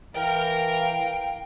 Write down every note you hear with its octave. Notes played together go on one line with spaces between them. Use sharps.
E3 A#4 F5 G5